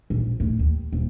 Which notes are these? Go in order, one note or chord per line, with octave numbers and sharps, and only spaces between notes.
A#1
A2
D#2
D#1